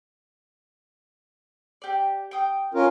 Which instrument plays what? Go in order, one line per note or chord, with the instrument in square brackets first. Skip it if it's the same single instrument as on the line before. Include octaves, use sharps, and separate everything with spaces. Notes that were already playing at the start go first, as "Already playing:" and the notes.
[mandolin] G4 D5
G5 D#6
[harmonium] C#4 F4 A#4